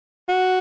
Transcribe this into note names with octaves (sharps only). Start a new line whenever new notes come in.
F#4